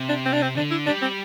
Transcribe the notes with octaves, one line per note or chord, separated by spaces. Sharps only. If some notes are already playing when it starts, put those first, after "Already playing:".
Already playing: C3
D4
C4
D4
C4
D3 D4
E4
G3 D4
C4